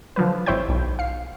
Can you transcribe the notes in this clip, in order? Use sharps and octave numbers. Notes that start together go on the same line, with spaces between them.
D3 F3 F#3 B4
G#1 E4 C5 C#5 G5 G6
B1
F5 C7